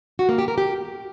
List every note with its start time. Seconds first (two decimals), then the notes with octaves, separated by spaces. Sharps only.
0.19 F#4
0.29 A#3
0.38 G4
0.48 A#4
0.58 G4